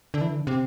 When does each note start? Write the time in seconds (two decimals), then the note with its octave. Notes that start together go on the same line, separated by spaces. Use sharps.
0.14 D3
0.21 E3
0.30 D3
0.47 C3